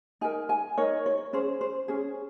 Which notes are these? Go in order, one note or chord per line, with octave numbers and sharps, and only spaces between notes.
D#4 A#4 G#5
G#5
D#4 A#4 C#5
C#5
C#4 G#4 C5
C5
C#4 G#4